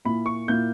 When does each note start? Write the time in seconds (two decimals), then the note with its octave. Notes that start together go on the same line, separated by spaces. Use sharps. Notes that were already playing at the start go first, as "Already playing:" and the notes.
0.05 A#2 A#3 E4 B5
0.26 C#6
0.48 A#2 A#3 E4 G6